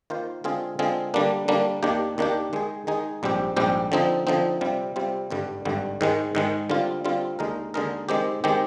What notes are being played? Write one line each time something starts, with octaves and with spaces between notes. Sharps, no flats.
D#3 A#3 F4 C5
D3 G#3 C4 F4 G#4
D3 G#3 C4 F4 G#4
D3 G3 A#3 D4
D3 G3 A#3 D4
D#2 D#3 A#3 D4 G4
D#2 D#3 A#3 D4 G4
D#3 G#3 D#4 G#4
D#3 G#3 D#4 G#4
A#1 G#2 G3 C4 G4
A#1 G#2 G3 C4 G4
D3 F3 C4 D#4
D3 F3 C4 D#4
C3 G3 C4 F4
C3 G3 C4 F4
G#1 G2 D3 G3
G#1 G2 D3 G3
G#2 D#3 G#3
G#2 D#3 G#3
D3 G3 C4 F4
D3 G3 C4 F4
D#2 D3 G#3 D#4 A#4
D#2 D3 G#3 D#4 A#4
D#3 G#3 C4 G4
D#3 G#3 C4 G4